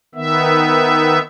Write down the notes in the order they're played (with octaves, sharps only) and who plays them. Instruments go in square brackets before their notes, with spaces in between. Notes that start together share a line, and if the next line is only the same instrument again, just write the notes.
[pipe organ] D#3 B3 E5